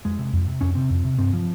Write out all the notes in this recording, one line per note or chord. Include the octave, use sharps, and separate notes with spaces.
F2 G#3
C3
F2
C3
F2 C#4
C3 C4
F2
C3
G2 C4
F3